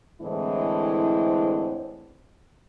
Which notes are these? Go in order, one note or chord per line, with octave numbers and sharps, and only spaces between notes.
A2 D3 E3 G#3 C4 E4